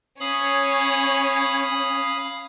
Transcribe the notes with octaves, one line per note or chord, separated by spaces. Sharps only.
C#4 C#5 F5 B5 D#6